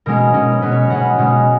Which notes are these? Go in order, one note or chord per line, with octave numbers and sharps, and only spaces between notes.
B2 G#3 C#4 A#4
B2 G#3 C#4
B2 G#3 C#4 B4
C#5
B2 G#3 C#4 F#5
B2 G#3 C#4